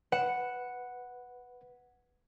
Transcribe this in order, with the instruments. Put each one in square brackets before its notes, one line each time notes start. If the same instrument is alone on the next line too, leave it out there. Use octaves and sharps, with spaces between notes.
[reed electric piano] B4 [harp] F#5 C#7 E7